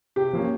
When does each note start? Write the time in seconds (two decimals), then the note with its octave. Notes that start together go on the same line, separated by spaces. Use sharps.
0.16 C3 G4
0.33 F3 A#3 C#4